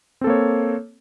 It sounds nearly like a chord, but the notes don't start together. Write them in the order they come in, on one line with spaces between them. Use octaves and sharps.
C4 A4 A#3 C#5